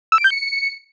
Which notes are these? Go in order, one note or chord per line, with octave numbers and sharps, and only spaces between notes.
E6
D7
G6
C#7